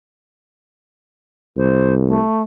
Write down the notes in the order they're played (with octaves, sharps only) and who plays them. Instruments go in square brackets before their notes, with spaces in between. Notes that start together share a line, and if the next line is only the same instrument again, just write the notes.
[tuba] C2 [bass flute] C5
[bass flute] A3